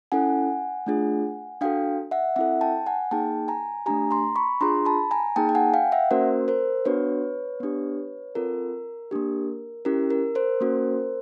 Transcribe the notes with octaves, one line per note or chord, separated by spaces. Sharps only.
C#4 E4 A4 F#5 G#5
A3 D4 F4 G#4
D4 F#4 A4 F5 G5
E5 F#5
C4 E4 A4 E5 F#5
G5 A5
F#5 G#5
A#3 D#4 G#4 G5 A5
G#5 A#5
A3 D4 G4 G#5 A#5
A#5 C6
B5 C#6
D4 F4 G#4 A#5 C6
A5 B5
G#5 A#5
A#3 D#4 G#4 G5 A5
G5
F#5 G#5
F5 G5
E5 F#5
A#3 C#4 F#4 A#4 C5
A#4 C5
B3 D4 F#4 B4 C#5
B3 D4 G4
C4 F4 A4 A#4
A#3 D4 G4
C#4 E4 G4 A#4
A#4
A#4 C5
A#3 C#4 F#4